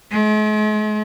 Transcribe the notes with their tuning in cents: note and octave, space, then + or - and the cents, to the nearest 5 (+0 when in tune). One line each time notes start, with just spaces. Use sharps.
G#3 +45